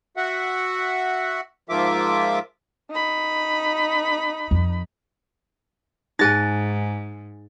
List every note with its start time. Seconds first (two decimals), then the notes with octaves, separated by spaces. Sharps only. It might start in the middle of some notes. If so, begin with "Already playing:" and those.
0.17 F#4 E5 F#5
1.69 G#2 F3 A#3 F4 E5 D6
2.90 D#4 B5
4.51 F2
6.19 G#2 D#4 G#4 G#5 F#6 A6 A#6